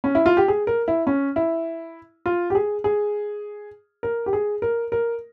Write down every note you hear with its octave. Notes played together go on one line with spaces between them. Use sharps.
C#4
E4
F4
G4
G#4
A#4
E4
C#4
E4
F4
G4
G#4
G#4
A#4
G4
G#4
A#4
A#4